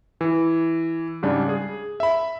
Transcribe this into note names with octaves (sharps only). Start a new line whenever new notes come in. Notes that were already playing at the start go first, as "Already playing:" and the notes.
E3
G#2 C#3 G3 D4
G#4
E5 B5